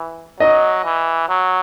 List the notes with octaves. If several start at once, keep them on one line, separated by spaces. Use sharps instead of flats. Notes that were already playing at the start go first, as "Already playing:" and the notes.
Already playing: E3
F#3 D#5
E3
F#3